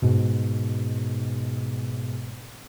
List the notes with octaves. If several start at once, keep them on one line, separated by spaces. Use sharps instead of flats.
G#2 B2